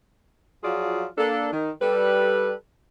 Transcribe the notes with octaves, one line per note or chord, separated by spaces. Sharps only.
F3 F#3 F4 F#4 G#4 D5
A#3 D4 A4
D#3
G3 A4 B4